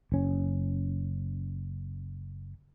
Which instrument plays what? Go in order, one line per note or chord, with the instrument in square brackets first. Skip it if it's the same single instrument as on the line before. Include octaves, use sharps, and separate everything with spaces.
[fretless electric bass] F#1 C#4